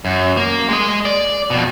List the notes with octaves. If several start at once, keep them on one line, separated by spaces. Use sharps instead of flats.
F#2
A#3
G#3 D#5
D5
F2 B2